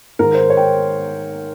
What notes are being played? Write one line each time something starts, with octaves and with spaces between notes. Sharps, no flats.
G#2 D#3 A#4
C5
C#5
G5